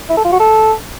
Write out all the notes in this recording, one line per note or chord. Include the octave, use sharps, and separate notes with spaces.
E4
A4
F4
F#4
A4